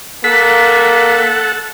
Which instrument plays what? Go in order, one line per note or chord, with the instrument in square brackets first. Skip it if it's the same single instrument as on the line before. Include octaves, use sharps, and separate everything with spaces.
[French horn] A#3 [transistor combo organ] A4 F#5 [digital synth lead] B6